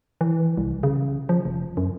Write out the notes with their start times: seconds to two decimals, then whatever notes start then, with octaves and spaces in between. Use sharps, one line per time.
0.21 E3
0.57 C2
0.83 C#3
1.29 F3
1.45 F1
1.77 F#2